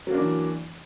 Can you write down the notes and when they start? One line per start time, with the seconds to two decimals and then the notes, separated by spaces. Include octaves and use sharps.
0.07 F#3
0.11 A#3
0.14 D4
0.18 E3